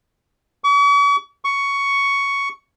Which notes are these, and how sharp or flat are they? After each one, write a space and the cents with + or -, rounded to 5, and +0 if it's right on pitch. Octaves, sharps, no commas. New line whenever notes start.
C#6 +45
C#6 +10